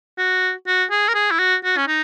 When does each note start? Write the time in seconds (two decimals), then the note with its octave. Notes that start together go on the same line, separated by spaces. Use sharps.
0.18 F#4
0.67 F#4
0.91 G#4
1.09 A#4
1.15 G#4
1.31 E4
1.39 F#4
1.64 F#4
1.77 C#4
1.88 D#4